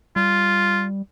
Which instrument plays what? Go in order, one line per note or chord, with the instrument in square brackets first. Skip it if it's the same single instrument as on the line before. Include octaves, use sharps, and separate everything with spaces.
[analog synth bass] G3 [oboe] F4